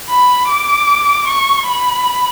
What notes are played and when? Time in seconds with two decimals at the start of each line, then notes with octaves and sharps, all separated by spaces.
0.10 B5
0.49 D6
1.28 C#6
1.67 B5